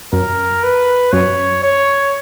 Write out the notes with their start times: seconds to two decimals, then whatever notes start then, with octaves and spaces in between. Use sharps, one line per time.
0.13 F#2 A#4
0.63 B4
1.12 F#2 C#5
1.63 C#5